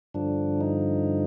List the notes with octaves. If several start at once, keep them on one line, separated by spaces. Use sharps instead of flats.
G2 D3 F3 D4
D#4